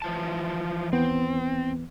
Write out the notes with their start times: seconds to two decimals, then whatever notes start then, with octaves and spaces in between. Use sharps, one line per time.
0.02 E3 F3 A5
0.93 D#2 E3 B3 C4